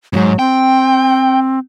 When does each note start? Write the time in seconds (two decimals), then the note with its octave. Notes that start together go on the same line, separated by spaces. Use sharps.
0.13 F2 G#2 F#3
0.39 C4 G5